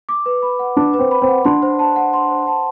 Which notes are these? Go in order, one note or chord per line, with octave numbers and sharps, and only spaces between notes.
D6
B4
B5
F#5
D4 D6
B4
C4
B5
C4
F#5
D4 C6
C5
A5
F#5
C6
C5
A5